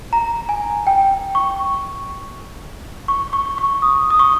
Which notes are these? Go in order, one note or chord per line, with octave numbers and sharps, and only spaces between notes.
A#5
G#5
G5
C#6
C#6
C#6
C#6
D#6
D#6
C#6